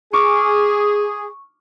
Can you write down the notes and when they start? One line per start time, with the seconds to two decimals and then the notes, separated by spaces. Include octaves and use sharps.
0.13 G#4 C#6 D6 F6